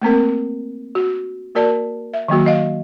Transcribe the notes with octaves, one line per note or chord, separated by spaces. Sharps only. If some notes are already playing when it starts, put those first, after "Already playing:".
A3 A#3 C4 A#4
F#4
A#3 F#4 A#4 D5 A5
E5
D#3 F#3 A#3 F#4
D#5 F5